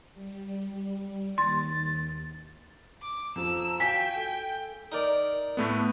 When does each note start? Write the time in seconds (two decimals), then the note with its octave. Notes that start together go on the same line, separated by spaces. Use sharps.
0.14 G3
1.38 D#2 C6 A6
3.02 D6
3.36 F2 F3 A#5 E6
3.80 F#4 F5 G5 G#5 B6
4.15 A4
4.92 D#4 A#4 D5
5.57 A2 A3 B3